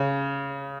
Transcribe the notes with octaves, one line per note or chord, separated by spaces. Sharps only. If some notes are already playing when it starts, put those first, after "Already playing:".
Already playing: C#3